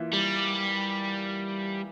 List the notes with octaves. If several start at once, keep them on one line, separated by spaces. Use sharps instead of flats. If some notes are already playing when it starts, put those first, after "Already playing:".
Already playing: E3 A#3 F4 E5
G3